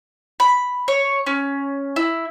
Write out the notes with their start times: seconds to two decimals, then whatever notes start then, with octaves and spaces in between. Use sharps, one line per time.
0.40 B5
0.88 C#5
1.26 C#4
1.96 E4